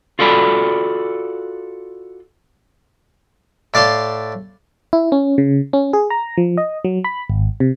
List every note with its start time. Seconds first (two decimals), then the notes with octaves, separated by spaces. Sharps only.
0.19 F4 F#4 A4 D5 B5
3.74 A2 D5 F5 A5 C6
4.93 E4
5.12 C#4
5.38 C#3
5.73 C#4
5.93 G#4
6.10 A#5
6.37 F3
6.58 D#5
6.85 F#3
7.04 B5
7.30 G#1
7.60 C3